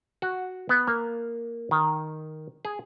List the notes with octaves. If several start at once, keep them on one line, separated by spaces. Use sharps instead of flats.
F#4
B3
A#3
D#3
G#4